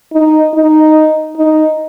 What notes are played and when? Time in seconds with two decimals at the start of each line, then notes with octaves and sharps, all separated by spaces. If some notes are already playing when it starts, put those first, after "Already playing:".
0.13 D#4
0.54 D#4
1.37 D#4